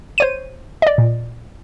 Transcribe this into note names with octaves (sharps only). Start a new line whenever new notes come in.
C5 C#5 D#7
D5 D#5
A#2